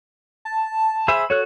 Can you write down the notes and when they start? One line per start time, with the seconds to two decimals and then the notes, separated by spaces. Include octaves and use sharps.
0.45 A5
1.08 G#4 C5 E5 B5
1.30 F#4 A4 C#5 F#6